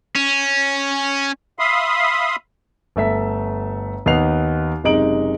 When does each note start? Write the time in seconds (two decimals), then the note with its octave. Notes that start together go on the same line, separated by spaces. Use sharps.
0.16 C#4
1.59 E5 F5 B5 C6 D#6
2.96 G1 A3 E5 B6
4.06 D#2 B3 D#4 C7 F7
4.84 F#1 C3 G#3 D#4 D7 F#7